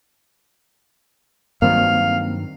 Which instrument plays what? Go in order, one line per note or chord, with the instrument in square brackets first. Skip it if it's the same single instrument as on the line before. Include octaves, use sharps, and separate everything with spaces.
[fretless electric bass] G2 D#3 F#3 [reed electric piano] A#3 C4 [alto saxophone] F5